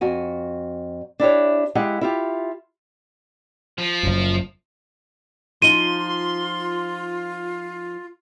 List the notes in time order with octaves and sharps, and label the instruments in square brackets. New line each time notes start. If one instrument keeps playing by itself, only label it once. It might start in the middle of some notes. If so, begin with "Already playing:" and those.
[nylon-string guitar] F2 F#4 G#5
D4 E4 G4 C#5
G#3 E4 G4 F5 F#5
E4 F4 G4
[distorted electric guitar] F3
[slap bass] F#1 F#2
[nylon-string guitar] F3 D#4 [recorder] F4 [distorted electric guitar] C6 [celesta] D#7 G7